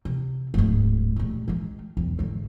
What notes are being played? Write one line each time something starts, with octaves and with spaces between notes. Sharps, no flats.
C3
D1 G#2
D#1 A2
D#3 G#3
B1 E2
G#1 D3